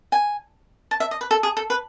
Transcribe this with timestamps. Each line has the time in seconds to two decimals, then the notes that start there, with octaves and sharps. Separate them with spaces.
0.12 G#5
0.91 A5
1.00 E5
1.11 D#5
1.21 B4
1.31 A4
1.43 G#4
1.57 A4
1.70 B4